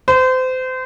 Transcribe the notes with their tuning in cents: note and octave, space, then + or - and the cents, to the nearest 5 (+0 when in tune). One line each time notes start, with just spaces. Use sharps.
C5 -30